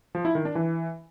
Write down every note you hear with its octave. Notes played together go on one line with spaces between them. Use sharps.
F3
E4
D#3
D4
E3